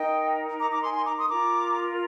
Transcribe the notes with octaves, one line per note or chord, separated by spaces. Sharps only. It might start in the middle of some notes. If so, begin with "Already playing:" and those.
Already playing: D#4 A#4 D#5 G5
A#5 D6
A#5 D6
G#5 C6
G#5 C6
A#5 D6
C6 D#6
F4 A#4 A#5 D6